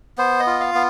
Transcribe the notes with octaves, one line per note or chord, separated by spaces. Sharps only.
B3 C5
D#5
F4
F5
B3